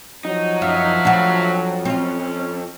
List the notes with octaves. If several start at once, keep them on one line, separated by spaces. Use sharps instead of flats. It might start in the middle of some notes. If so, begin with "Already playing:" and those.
F3 F#3 D#4
F#2 E5 F5
F2 D4 F#4
C4 C#4 F4